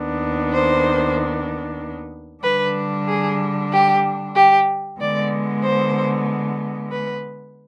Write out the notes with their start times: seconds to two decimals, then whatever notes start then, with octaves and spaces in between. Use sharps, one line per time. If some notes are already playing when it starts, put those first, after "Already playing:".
Already playing: D#2 D#3 B3 D4
0.52 C5
2.43 D3 G3 D4 B4
3.07 G#4
3.72 G4
4.35 G4
4.99 D3 G#3 B3 D5
5.63 C5
6.91 B4